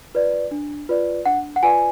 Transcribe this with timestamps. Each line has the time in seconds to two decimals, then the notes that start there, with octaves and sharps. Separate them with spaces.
0.14 F4 B4 D5
0.51 D4
0.89 F4 B4 D5
1.25 D4 F#5
1.56 F#5
1.63 F4 B4 D5 G#5